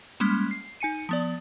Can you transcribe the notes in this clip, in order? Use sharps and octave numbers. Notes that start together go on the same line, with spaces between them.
G3 G#3 A#3 C#4
C7
D#4 G#5 C#7 D#7
F3 B3 D5